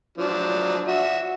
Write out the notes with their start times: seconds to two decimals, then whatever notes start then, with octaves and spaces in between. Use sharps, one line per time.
0.18 F3 F#3 D4
0.88 F#4 E5